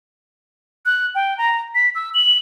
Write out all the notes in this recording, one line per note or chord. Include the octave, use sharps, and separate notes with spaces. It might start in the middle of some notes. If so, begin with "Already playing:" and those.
F#6
G5
A#5
B6
E6
F#7